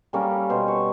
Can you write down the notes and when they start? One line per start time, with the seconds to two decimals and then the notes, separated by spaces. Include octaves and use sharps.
0.13 G3 A#3 C#4 A4
0.50 B2 C5
0.68 C#5